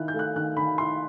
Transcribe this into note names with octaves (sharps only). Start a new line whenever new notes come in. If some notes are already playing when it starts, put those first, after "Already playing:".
Already playing: D#3 E4 F#6
G6
A3
F#6
D#3 F#6
D#3 B5
E4 C6